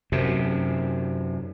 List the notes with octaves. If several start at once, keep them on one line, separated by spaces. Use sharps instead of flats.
F#2 C3